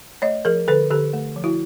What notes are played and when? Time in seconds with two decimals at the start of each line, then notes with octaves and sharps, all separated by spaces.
0.22 A3 C#5 D#5
0.45 F3 G#4 A#4
0.68 D3 A4 B4
0.91 D3 G4 A4
1.13 A3
1.36 F3
1.44 E4 F#4